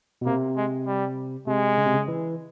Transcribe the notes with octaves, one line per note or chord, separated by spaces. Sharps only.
B2
C3 A#3
G#3
G3
C3 G#3
C#3
C3
C#3
E3